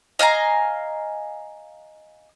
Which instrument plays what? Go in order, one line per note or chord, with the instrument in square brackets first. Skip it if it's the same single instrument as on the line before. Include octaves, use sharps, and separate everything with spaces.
[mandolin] D#5 F5 G#5 A#5